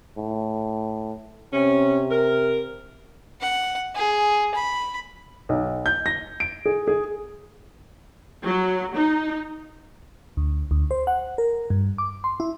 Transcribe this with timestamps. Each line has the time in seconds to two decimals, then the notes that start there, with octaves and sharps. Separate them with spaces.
0.17 A2
1.53 C3 C#4
2.11 A#4
3.41 F#5
3.95 G#4
4.55 B5
5.49 B1
5.86 G6
6.06 A#6
6.40 D7
6.66 G#4
6.88 G#4
8.44 F#3
8.96 D#4
10.37 D2
10.71 D2
10.91 C5
11.07 F#5
11.38 A#4
11.70 G2
11.98 D6
12.24 C6
12.40 E4